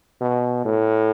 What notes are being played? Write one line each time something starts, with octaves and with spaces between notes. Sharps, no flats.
B2
A2